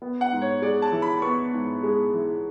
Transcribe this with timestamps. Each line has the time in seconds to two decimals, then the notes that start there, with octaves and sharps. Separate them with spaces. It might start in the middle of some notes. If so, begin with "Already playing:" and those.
0.02 B3
0.21 F#5
0.32 G#2
0.41 C#5
0.62 G#3 D5
0.82 A5
0.92 E3
1.02 B5
1.22 B3 C#6
1.53 G#2
1.83 G#3
2.13 E3